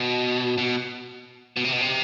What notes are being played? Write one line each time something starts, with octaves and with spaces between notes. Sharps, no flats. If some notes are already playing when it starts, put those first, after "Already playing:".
Already playing: B2
B2
B2
C3
B2
C3